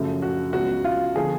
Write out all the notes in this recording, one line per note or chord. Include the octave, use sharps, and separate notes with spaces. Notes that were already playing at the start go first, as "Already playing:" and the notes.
Already playing: F#2 C#3 F3 A3
F#4
C#2 C#3 F#3 B3 F#4
F4
D3 F3 B3 G#4